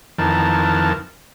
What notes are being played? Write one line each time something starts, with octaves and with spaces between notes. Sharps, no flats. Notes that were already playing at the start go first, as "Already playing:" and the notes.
F2 D#3 E3 A#4 A5